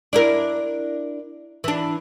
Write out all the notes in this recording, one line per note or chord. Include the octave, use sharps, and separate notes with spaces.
D4 E4 A#4
E3 D4